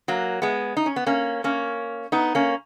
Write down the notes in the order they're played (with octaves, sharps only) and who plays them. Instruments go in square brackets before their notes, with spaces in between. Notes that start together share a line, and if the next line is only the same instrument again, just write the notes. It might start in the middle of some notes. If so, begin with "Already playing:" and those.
[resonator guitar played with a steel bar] F#3 A#3
G#3 B3
D#4
C#4
B3
A#3 C#4
A#3 C#4
B3 D#4
A#3 C#4